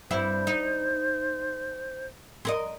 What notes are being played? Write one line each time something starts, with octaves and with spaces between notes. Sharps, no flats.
G2 C4 E4 C5
D#4
C4 A#4 D#5